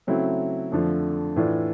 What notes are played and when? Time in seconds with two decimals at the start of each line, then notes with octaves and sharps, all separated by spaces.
0.07 C#3 F#3 A3 C4 E4
0.72 F2 D3 F3 A3
1.36 A2 E3 A3 D4 F4